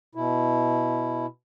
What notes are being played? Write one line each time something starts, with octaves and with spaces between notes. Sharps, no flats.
B2 E4